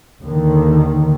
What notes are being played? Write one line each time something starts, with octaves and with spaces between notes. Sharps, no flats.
D#2 D3 D#3